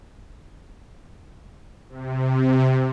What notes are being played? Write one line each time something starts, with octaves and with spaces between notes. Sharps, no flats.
C3